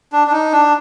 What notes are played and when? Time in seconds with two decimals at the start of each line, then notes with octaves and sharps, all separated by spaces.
0.12 D4
0.27 D4
0.32 D#4
0.53 D4